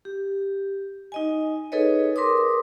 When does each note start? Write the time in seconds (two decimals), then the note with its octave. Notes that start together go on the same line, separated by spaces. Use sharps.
0.05 G4
1.12 D#4 D#5 G#5
1.72 D#4 G#4 A4 B4 C#5 D#5
2.16 A#4 B4 C6 D6 D#6